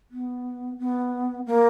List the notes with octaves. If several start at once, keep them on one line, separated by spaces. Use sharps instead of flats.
B3
B3
A#3